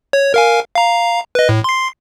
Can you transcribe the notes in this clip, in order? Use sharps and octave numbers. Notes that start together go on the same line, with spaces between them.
C#5
A#4 F5 G#5
F5 A#5
B4 D#5
A2
C6 C7